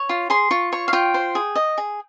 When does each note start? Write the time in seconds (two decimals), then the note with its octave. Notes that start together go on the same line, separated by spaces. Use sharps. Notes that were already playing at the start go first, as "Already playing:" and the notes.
Already playing: C#5
0.09 F4
0.30 G#4 C6
0.51 F4 C#6
0.72 C#5 C#6
0.88 F5
0.93 F4 G5
1.14 C5
1.35 G#4
1.56 D#5
1.78 G#4